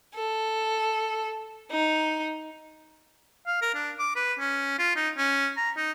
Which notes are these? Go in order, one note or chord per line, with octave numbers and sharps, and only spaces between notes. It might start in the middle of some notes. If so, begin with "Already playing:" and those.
A4
D#4
F5
A#4
D4
D6
B4
C#4
F4
D#4
C#4
A#5
D#4